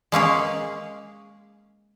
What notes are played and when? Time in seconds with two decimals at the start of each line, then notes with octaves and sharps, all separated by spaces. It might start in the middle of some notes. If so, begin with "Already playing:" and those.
0.12 G#3 A#3 C#4 G#4